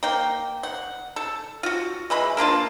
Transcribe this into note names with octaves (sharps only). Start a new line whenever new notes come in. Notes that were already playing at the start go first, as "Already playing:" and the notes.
A#3 G5
F#5
A4
F4 F#4
E3 G#3 B5
A#3 D4 F4 A5